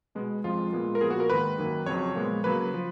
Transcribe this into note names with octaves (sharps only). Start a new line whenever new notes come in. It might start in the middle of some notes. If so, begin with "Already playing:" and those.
B2 G#3 B3
F2 F3 G#3 F4
A#2 G#3 B3
A#4
A#2 F3 B3 G#4
F#4
A#4
G#2 D#3 A#3 B4
F#2 D#3 F#3 A#3
F2 C#3 F#3 C#5
A#2 F3 G#3 B3
C#3 F#3 A#3 B4
F3